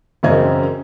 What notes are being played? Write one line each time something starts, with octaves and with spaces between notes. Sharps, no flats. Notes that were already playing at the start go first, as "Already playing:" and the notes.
E1 F#2 C#3 C4 D#5 G#6